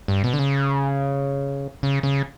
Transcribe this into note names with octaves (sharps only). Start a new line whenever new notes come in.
G2
B2
D3
C#3
C#3
C#3